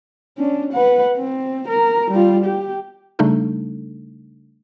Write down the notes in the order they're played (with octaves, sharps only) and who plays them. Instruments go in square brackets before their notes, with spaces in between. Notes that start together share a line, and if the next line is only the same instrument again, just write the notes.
[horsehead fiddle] C#4 D4
B4 F#5
C4
A#4
G3 F4
G4
[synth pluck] C#3 G3 A3 D4 D#4 A4